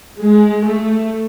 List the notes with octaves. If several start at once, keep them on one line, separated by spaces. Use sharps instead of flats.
G#3
A3